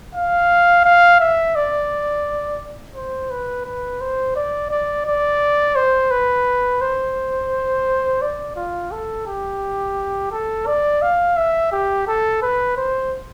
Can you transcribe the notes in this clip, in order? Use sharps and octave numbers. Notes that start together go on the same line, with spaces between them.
F5
F5
E5
D5
C5
B4
B4
C5
D5
D5
D5
C5
B4
C5
D5
F4
A4
G4
A4
D5
F5
E5
G4
A4
B4
C5